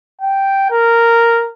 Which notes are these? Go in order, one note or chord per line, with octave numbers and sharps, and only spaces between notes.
G5
A#4